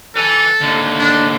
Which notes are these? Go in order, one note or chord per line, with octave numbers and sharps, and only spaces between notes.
A4 B4 G#5
D#2 D3
D4